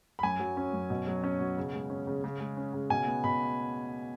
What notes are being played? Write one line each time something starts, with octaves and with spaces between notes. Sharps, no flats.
B5
F#2 G#5
F#3
C#4
F#2
B2
F#3
C#4
B2
C#3
G#3
C#4
C#3
C#3
G#3
C#4
C#3
B2 G#5
B3
B2 B5